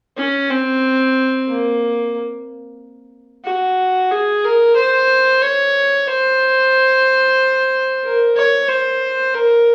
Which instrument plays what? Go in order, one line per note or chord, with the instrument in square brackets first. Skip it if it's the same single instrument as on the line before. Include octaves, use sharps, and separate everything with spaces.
[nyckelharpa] C#4
C4
A#3
F#4
G#4
A#4
C5
C#5
C5
A#4
C#5
C5
A#4